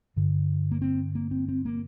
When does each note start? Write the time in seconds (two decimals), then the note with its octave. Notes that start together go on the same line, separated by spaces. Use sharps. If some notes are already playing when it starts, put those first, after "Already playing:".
0.16 G2 D3
0.72 A#3
0.81 C4
1.15 A#3
1.31 C4
1.49 C4
1.65 A#3